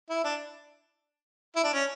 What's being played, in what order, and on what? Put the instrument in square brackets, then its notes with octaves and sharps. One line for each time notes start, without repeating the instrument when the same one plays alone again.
[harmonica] E4
D4
E4
D4
C#4